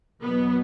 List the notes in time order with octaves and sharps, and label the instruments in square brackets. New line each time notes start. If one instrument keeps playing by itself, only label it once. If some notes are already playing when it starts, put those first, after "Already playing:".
[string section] E2 B2 F#3 B3